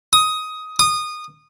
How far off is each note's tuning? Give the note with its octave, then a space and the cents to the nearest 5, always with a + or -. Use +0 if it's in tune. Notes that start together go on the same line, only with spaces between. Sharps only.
D#6 +15
D#6 -20